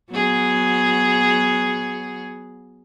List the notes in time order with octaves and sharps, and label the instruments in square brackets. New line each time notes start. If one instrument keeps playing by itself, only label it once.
[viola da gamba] F#3 B3 G#4